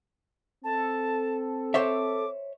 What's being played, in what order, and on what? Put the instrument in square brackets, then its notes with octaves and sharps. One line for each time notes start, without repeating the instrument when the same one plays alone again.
[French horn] C4 [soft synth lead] A4 [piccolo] A5
[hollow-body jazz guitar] C5 C#5 E5 [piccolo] D6